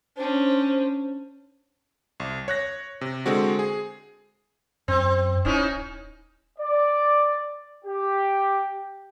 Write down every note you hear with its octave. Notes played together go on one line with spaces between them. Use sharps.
C#4 D4 C5
C2
C#5 F#6 A#6
C3
D3 G#3 C4 F#4
G#4
F#2 C4
D1 C#4 D#4 E4
D5
G4